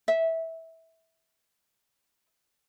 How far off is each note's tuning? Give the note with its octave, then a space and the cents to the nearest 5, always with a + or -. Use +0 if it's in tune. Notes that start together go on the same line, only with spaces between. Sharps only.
E5 -15